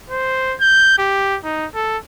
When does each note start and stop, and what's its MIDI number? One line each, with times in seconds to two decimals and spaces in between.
0.10 0.55 72
0.60 0.93 91
0.98 1.37 67
1.44 1.66 63
1.75 1.98 69